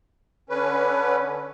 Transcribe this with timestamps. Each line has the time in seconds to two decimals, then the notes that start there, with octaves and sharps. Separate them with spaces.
0.50 D3 C#4 B4